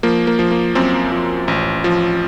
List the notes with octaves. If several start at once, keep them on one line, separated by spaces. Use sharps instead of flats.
F3 A#3
A#3
F3
A#3
F#2 C4
F3
A1
F3